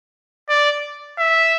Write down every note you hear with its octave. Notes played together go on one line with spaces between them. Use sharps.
D5
E5